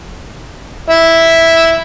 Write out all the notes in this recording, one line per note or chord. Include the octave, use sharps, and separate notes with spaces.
E4 E5